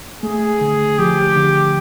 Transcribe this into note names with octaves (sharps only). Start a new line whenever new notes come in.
A3 G#4
D3
F3 G4
D3